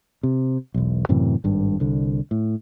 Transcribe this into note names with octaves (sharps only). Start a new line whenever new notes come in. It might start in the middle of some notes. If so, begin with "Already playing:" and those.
C3
E1 B1
F#2 A2 C3 E3
G#1 G2
C2 D3
A2